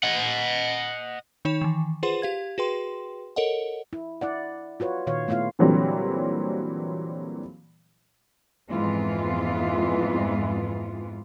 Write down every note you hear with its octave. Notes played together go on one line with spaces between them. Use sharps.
D#5 F#5
D#3 D#4 C#5 B5 E7
D#3 E3
F4 G#4 B4 C5 F#5 C6
G4 F5 G#6
F#4 G#4 B4 G5 C6
A4 A#4 C#5 D#5 F#5
E4
E4 D5 F#5
F4 F#4 B4 C#5
A#2 D#3 C#5 F5
A3 B3 E4 F4 F5
A#2 D3 E3 F#3 G3 C4
F2 G#2 E3 G#3 B3 F4